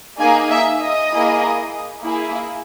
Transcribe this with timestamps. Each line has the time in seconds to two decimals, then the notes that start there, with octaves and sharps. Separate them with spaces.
0.20 A#3 D#4 G#4 G#5
0.50 E5
0.81 D#5
1.12 A#3 E4 G#4
2.03 A#3 E4 G#4